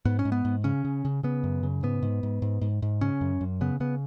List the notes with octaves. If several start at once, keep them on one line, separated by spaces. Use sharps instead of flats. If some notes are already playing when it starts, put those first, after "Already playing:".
G#2 B3
C#4
G#2
B3
G#2
C#3 C#4
C#3
C#3
C#3 B3
F#2
C#3
G#2 B3
G#2
G#2
G#2
G#2
G#2
C#3 C#4
F#2
F#2
C#3 B3
C#3 B3